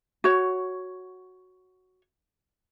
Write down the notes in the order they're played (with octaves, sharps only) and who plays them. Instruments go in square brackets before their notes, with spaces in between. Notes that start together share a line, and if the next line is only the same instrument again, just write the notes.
[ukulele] F#4 C#5